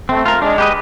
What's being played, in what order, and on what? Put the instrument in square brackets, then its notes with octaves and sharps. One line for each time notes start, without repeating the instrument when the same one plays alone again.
[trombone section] A3 [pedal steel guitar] C4
[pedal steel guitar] F4 A#4
[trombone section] G#3 [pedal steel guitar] D4
[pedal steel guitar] G4 B4 D#5